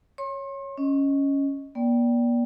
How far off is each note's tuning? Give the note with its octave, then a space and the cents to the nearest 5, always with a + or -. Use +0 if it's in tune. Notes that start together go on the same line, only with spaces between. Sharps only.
C#5 -5 C6 +40
C#4 +0 D#5 +0
A#3 +45 D5 -20 G5 +0